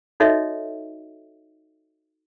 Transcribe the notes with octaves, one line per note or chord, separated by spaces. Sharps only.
D#4 F#4 A4 C#5 D#5 E5